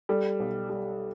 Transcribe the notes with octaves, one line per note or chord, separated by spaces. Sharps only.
G3 A4
B1
G3